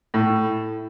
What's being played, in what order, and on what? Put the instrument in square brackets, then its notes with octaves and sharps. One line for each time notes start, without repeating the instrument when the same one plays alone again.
[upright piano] A2 [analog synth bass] E4
[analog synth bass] E4